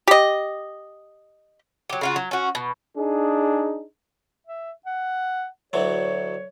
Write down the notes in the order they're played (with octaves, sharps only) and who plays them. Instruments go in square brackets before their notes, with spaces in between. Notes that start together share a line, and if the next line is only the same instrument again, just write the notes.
[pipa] G4 D#5
[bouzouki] F#3 G4
C#3 F4 F#4
F#3
C#4 F#4
B2
[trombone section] D4 D#4 G#4
[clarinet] E5
F#5
[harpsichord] D2 E3 F#3 [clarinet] C#5